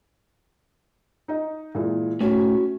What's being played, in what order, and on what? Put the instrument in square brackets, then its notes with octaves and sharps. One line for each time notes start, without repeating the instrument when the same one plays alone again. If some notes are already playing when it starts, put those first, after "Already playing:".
[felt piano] D#4 D#5
A#2 E3 G#3
[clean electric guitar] A2 [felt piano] C#4 [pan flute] F#4